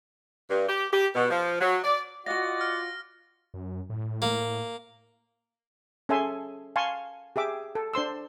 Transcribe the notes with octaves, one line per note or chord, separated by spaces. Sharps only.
G2
G4
G4
B2
F3
F#3
D5
F4 F#4 D5 D#5 F5 F#5 A#6
F6
F#2
A2
A#3
C#4 G#4 A4 E5 G#5 C6
F5 G#5 A5 C6 C#6
G4 G#4 E5 D6
A4
D4 C5 C6 E6